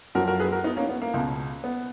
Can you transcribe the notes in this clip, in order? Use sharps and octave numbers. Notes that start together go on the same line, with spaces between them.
F#2 F3 F#4 A#4
F#4 A#4
G#4 B4
F#4 A#4
B3 D#4
A#3 C#4
B3
A#3
C#2 B2
B3